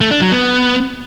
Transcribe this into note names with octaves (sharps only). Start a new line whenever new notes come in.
A3
D4
F#3
B3